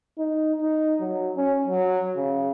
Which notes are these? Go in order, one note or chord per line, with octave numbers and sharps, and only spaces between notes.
D#4
D#4
F#3
C#4
F#3
C#3